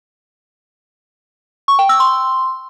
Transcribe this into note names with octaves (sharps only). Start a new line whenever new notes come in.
C#6
G5
E6
C6